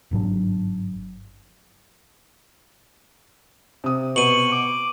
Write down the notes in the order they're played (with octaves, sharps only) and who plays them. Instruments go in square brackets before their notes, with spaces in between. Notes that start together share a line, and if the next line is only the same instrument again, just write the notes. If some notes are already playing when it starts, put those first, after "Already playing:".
[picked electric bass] G1 G#2 F#3 D4
[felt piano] C3 D#6
[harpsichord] B2 [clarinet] C#6 [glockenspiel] D#7 F#7
[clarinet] D6